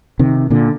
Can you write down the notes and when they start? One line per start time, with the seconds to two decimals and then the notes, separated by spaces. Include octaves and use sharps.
0.19 C3 D#3
0.50 A#2 D3